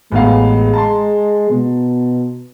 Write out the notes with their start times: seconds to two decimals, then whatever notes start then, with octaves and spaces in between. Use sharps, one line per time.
0.12 A1 G#3 B3 F5
0.74 A5 A#5 C6
1.50 B2